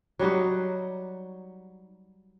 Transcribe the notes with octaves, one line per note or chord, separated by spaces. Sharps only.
F#3 G3 D#4 F#4